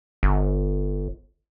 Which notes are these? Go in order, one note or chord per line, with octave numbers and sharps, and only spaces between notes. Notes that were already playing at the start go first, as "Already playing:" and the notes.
G1